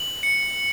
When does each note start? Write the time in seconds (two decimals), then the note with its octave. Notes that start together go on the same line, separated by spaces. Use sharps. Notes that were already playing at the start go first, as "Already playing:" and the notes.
Already playing: F#7
0.23 C#7